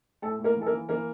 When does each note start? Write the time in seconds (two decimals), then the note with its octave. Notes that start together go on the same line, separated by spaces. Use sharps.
0.22 A2 A3 A4
0.39 A2
0.44 A#3 A#4
0.57 E3 A4
0.66 A#3 A#4
0.73 E3
0.89 E3 A#3 A#4